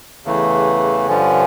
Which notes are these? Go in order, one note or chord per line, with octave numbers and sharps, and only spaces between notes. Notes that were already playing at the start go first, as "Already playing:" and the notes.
E2 C#3 E3 A3
G2 D3 F3 C#4